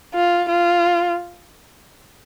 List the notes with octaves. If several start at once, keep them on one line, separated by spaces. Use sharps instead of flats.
F4
F4